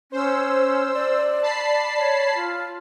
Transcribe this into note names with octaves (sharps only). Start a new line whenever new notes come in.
C#4 C5 E6
D5
A5 B5 C7
C#5
F4